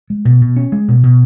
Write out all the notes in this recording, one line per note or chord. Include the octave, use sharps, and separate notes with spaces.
G#3
B2
B2
C#4
G#3
B2
B2